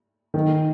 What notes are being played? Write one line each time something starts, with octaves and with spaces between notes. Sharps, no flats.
D#3